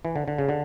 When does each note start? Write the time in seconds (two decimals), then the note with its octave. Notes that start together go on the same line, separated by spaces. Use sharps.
0.05 E3
0.16 D3
0.28 D3
0.38 C#3
0.49 D3